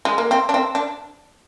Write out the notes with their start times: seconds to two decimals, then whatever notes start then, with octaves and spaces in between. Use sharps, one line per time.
0.05 G#3
0.18 A#3
0.31 C4
0.49 D4
0.54 C4
0.75 D4